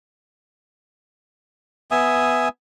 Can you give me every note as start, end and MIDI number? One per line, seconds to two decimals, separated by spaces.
1.91 2.48 59
1.91 2.48 76
1.91 2.48 80
1.91 2.48 87